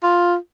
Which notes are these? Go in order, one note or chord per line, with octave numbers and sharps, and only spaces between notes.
F4